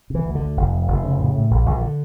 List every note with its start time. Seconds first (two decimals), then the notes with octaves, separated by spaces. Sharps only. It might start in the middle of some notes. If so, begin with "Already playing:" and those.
0.10 C3 E3
0.25 D2
0.35 D3
0.41 D2
0.57 F1
0.72 F2
0.88 F1
1.03 C#3
1.19 A2
1.35 A2
1.51 A#1
1.66 A#1
1.81 D3